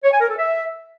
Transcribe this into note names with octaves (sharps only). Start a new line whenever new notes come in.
C#5
G#5
A#4
A4
E5